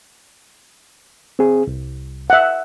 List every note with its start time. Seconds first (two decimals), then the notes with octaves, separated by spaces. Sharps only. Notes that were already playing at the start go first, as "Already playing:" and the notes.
1.39 C4 G#4
1.67 C2
2.30 E5 F#5